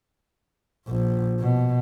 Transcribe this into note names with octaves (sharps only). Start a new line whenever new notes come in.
A#1
B2